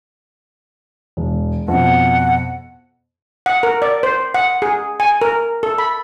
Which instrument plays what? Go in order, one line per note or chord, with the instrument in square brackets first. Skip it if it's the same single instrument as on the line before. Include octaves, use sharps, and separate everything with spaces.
[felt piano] E1
[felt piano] F2 B2 [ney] F#5
[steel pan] F#5
A#4
D5
C5
F#5
G#4
G#5
A#4
A4
B5